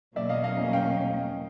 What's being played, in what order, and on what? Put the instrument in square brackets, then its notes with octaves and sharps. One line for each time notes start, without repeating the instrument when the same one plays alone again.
[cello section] E2 B2 F#3 A#3 C#4 [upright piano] D5 E5
[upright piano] D#5 F5
D#5 F5
F5 G5